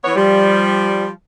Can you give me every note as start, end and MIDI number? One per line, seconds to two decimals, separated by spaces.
0.04 0.12 52
0.04 0.12 59
0.04 0.12 73
0.16 1.08 53
0.16 1.08 55